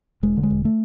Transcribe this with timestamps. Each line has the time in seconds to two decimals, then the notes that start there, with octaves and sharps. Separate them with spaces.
0.23 E1 G#3
0.37 D3
0.43 G#3
0.50 E1
0.65 A3